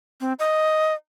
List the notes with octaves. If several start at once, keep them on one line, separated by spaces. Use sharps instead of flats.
C4
D#5